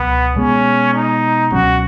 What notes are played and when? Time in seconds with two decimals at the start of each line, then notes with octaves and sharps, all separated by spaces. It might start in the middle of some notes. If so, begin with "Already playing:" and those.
Already playing: C#2 B2 F#3 B3
0.36 B2 G#3 B3 C#4
0.94 D#4
1.52 C#2 B2 F#3 C#4 F#4